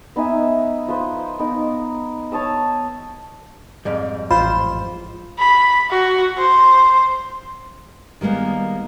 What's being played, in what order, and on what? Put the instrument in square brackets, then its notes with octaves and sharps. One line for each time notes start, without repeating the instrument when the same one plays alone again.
[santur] B3 D#4 E5 G#5
F3 B4 C5
B3 D#4 A#4
C#5 A5 D#6 E6
[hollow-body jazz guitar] F2 G#2 G3
[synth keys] A1 C5 E7 [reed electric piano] F4 [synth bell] B5
[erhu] B5
F#4
C5
[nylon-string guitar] D#3 G3 G#3 A#3 B3